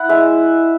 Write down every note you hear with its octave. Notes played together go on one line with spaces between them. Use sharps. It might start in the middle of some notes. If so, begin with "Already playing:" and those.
Already playing: E4 F#5
G#3 E5